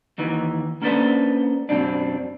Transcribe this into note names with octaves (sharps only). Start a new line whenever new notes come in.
D#2 D#3 E3
A#3 C#4 D4 A4 B4 C5
F#2 B2 C4 D4